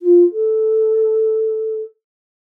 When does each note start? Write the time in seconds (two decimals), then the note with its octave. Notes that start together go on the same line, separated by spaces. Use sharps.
0.02 F4
0.32 A4